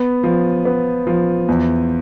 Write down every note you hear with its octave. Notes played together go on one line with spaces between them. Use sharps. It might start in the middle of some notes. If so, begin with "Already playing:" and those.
Already playing: B3
F3
B3
F3
E2